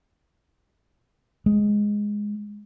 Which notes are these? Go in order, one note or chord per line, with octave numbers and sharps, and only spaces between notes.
G#3